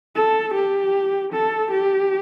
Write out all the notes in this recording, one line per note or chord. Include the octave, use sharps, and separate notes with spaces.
A4
G4
A4
G4